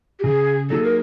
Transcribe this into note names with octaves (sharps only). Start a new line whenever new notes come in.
G4
C#3 G#4
F#3 A#3 D#4 G#4 A4
A#4